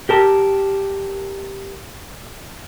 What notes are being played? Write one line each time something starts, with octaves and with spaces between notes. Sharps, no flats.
G4 A#4 A5